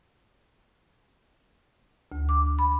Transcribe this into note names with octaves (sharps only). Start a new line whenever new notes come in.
D2
D6
B5